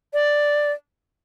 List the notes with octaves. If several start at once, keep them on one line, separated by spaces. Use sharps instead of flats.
D5